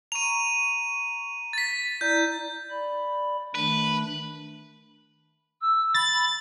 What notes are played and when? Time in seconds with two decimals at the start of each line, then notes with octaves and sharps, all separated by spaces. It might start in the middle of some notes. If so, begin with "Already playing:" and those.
0.12 A#5 C#6 D#7 F7
1.53 A6 B6
2.01 E4 D5 A#5 G6
2.70 D5 B5
3.55 D#3 A3 D4 B4
5.61 E6
5.94 B5 A6